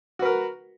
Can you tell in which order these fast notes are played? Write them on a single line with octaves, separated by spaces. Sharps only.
F#4 B4 A#4